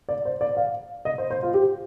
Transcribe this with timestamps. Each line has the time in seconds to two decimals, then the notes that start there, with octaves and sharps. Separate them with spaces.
0.09 D5
0.25 C5
0.41 D5
0.57 F5
1.05 D#5
1.18 C5
1.30 C5
1.43 F4
1.54 G4